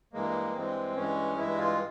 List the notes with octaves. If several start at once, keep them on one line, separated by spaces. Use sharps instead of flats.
G2 E3 G#3 A#3
G2 E3 G#3 C4
G2 E3 G#3 C#4
G2 E3 G#3 E4
F4